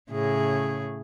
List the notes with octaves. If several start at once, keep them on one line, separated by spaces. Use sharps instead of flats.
A2 C#3 G#4